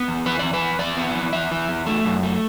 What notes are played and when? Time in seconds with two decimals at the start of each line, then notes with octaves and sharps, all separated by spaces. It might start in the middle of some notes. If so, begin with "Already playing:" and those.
Already playing: B3
0.08 E2
0.26 E3 B4
0.39 E2 D5
0.53 B4
0.61 E2
0.79 E2 D5
0.97 B3
1.15 E3
1.33 E2 E5
1.51 E3
1.68 E2
1.86 A3
2.04 F#2
2.23 A3